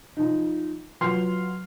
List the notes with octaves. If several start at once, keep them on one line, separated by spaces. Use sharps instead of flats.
F3 D#4
F#3 F4 B4 C6 F6 C7